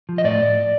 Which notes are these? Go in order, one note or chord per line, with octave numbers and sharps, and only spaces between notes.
F3
D#5
A2 D5